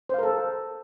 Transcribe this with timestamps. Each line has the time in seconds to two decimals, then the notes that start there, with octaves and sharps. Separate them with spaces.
0.09 C5
0.14 F5
0.18 A#4
0.23 A4